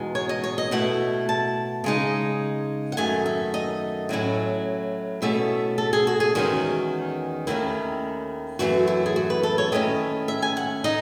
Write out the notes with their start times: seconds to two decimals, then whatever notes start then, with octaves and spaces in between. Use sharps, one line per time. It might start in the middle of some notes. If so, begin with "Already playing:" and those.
Already playing: E2 B2 G#3 D#4
0.15 C#5
0.29 D#5
0.44 C#5
0.58 D#5
0.71 B2 A3 E4 F#5
1.29 A5
1.84 C#3 G#3 D#4
2.92 F#5
2.97 F#2 D#3 A3 G#5
3.26 E5
3.54 D#5
4.09 A2 F#3 C#4 E4
5.22 B2 A3 C#4 E4 E5
5.78 A4
5.93 G#4
6.07 F#4
6.20 G#4
6.35 E2 D#3 G#3 C#4 F#4
7.47 D#2 D#3 A3 C#4 E4
8.59 F#2 E3 A3 F#4
8.87 E4
9.06 G#4
9.16 F#4
9.30 B4
9.43 A4
9.58 C#5
9.72 D#3 A3 C#4 E4 D#5
10.28 E5
10.42 G#5
10.57 F#5
10.84 D#4 D#5